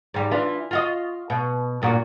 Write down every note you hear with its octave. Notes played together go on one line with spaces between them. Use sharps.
G#2 G3
E3 D4 F4
F4 F#4 D#5
B2
G2 A#2 F#4